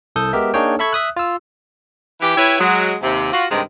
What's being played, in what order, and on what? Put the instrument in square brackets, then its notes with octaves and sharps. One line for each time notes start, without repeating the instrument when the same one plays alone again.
[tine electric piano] C2 A4 D#6 G6
G#3 B3 G4 A#4 E5
A#3 D4 D#4 G#4 C#5 G5
A4 E5 B5 C#6 G#6
E5 D#6 F#6
F4 E6
[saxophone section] E3 G4
E4 G4 B4 C#5
F#3 G#3
D#2 C3
F4 F#4
G2 C3 D#3 G#3